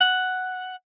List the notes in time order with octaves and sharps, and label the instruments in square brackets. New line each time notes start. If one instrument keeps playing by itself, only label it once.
[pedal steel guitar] F#5